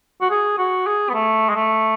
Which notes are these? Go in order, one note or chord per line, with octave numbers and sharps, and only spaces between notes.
F#4
G#4
F#4
G#4
B3
A3
G#3
A3